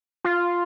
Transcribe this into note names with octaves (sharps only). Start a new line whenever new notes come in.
F4